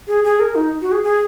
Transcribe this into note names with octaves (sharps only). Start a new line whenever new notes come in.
G#4
G#4
A#4
D#4
F#4
G#4
G#4